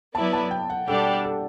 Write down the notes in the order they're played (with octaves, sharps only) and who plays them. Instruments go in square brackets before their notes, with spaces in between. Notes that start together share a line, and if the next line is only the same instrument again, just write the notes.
[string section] F#3 B3 E4 B4 D5 [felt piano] A5
[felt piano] A5
G5
F#5
[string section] B2 G3 D4 G4 D5 [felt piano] A4
[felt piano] A4